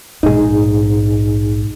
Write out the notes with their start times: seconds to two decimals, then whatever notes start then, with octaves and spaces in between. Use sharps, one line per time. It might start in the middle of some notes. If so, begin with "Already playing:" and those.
0.23 A#1 G#2 D#4 G#4